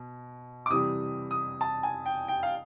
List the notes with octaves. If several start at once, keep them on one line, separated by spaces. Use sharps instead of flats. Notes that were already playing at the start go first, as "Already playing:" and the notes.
Already playing: B2
D6
C3 E3 G3 D#6
D#6
A5
G#5
G5
G5
F5